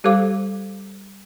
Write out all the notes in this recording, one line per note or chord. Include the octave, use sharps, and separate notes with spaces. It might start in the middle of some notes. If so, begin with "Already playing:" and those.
G3 G4 A4 C5 F5 D6